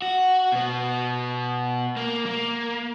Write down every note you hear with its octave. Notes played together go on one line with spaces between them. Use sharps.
F#4
B2 B3
A#3
A#3